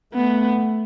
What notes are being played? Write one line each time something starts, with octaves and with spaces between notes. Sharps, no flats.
A3 B3